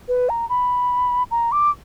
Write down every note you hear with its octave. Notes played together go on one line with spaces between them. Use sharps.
B4
A#5
B5
A#5
D6